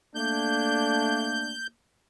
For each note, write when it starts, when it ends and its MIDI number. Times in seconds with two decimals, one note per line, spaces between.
0.15 1.53 57
0.15 1.73 58
0.15 1.53 62
0.15 1.67 91